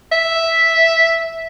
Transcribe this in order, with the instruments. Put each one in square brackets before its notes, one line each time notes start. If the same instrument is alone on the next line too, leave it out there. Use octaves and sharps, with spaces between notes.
[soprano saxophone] E5